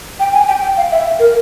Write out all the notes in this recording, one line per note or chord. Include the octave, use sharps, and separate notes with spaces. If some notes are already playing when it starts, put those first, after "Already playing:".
G5
G#5
G5
G5
F5
E5
A#4